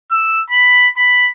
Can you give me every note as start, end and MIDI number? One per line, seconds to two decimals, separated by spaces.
0.11 0.40 88
0.50 0.87 83
0.97 1.29 83